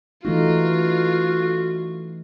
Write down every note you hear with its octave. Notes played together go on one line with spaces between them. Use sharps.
E3 A3 D#4 F4 F#4